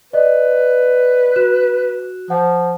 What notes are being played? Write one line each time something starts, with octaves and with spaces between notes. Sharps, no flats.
B4 D5 D#5
F#4 F#6 E7
F3 F#5